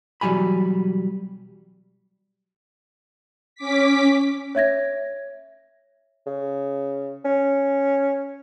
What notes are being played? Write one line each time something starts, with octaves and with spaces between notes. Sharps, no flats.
B2 E3 F#3 G3 G#5 B5
C#4 D6 B6
C#5 E5 G#6 A#6
C#3
C#4